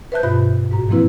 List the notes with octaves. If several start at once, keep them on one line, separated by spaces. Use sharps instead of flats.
B4 C5 E5 A5 F#6 G6
G2 B2 F4 D#5 E5 B5
G#2 F#4 A#5
E3 F3 A#3 C4 E4 B4